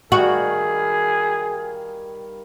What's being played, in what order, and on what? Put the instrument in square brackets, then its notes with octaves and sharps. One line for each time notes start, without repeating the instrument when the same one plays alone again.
[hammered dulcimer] D#3 G3 F5 [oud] F#4 [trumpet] G#4